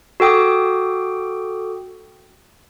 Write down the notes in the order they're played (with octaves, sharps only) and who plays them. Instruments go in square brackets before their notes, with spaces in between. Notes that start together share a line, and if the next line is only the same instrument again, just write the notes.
[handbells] F#4 A4 G5 D6 D#6